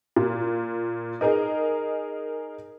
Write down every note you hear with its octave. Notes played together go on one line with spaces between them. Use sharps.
A#2
D#4 G#4 A#4 D#5